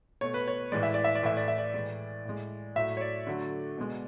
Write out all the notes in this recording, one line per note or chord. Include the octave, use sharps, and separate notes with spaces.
B2 A3 C#5
B4
C#5
A2 E3 G#3 D5
E5
D5
E5
D5
A2 E3 A3 E5
D5
E5
D5
A2 E3 G#3 D5
A2 G#3
A2 F#3 A3 E5
C#5
D5
D3 F#3 A3
B2 G#3